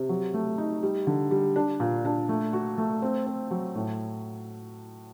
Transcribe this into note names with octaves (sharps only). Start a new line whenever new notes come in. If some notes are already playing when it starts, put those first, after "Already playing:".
Already playing: C3
F#3
A3
D#4
G3
D3
G3
D4
A#2
D4
A3
F#4
A3
C4
C4
F#3
A2